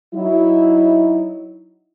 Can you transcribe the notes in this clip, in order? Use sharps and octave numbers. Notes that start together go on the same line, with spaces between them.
F#3 D#4 E4